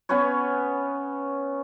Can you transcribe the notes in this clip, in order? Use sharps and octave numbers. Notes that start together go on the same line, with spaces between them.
B3 C#4 B4 C#5